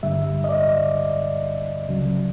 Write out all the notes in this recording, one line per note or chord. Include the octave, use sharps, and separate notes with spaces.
G2 D3 G3 E5
D#5
D5
C#2 C#3 F#3